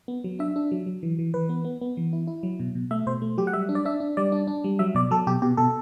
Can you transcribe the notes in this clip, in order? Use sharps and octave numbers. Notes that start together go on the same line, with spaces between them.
B3
F#3
D4 E5
D4
F#3
F#3
E3
E3
E3 B4
B3
B3
B3
E3
E4
E4
F#3
B2
B2
A3 E5
B2 C5
A3
F#3 G4
F#5
G3 E5
D4
D5
D4 E5
D4
G3 D5
D4
D4
G3
F#3 E5
B2 D5
F#3 A4
B2 G4
B2 G4
B2 A4